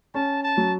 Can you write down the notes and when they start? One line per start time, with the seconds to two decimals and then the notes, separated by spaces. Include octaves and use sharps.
0.14 C#4 A5
0.43 A5
0.57 F#3